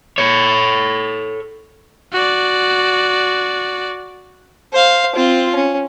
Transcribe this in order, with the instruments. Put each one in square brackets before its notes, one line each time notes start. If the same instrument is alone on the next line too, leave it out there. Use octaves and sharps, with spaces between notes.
[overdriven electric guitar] A4 C#5
[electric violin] F#4 D5
[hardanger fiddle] C5 F5
C4 F4
C#4